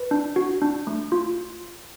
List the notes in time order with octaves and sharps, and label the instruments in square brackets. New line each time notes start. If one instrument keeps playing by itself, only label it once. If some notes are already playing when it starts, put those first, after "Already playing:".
Already playing: [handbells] B4
D4
F#4
D4
A3
F4